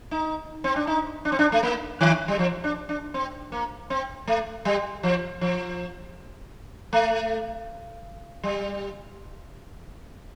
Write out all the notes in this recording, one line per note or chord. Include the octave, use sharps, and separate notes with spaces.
D#4
C4
D4
D#4
D4
C4
D4
A3
A#3
D#3
G3
F3
D4
D4
C4
A#3
C4
A3
G3
F3
F3
A3
G3